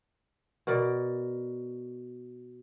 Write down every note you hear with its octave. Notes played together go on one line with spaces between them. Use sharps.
B2 A#4 D5